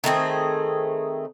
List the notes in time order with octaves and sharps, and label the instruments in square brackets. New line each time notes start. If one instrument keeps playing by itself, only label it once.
[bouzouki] D#3 A3 C4 G#4